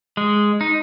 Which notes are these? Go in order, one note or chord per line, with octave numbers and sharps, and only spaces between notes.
G#3
D#4